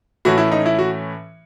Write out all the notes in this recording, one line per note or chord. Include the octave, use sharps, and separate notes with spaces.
A2 E3 A3 C#4 F#4
E4
D#4
E4
F#4